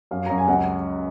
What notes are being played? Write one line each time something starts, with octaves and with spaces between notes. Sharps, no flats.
F#2 F5
F#2 A#5
G#5
C#2 F#5